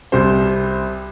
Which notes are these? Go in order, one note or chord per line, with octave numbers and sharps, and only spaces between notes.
C2 C3 G3 C5